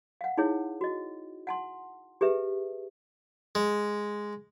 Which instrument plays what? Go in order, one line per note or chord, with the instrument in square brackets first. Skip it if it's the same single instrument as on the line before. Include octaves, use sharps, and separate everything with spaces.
[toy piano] F5 F#5
D#4 E4 G#4 C#5
F#4 D#5
F#5 A5 C6
G4 G#4 B4 E5
[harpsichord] G#3